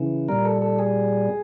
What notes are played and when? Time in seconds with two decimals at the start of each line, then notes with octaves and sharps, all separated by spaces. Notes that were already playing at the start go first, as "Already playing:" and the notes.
Already playing: C#3 E3
0.29 A#2 G3 A#4
0.45 A4
0.62 A4
0.79 G#4